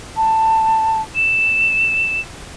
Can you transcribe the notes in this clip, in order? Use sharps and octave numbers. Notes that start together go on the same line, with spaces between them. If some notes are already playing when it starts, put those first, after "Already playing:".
A5
E7